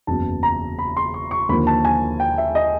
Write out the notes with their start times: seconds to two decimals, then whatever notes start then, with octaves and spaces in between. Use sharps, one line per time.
0.07 F#1 E2 C#3 F#3 B3 A5
0.43 A#5
0.79 B5
0.97 C6
1.14 C#6
1.31 C#6
1.49 D#2 D3 F3 A#3 B5
1.67 A5
1.85 G#5
2.20 G5
2.38 E5
2.55 D#5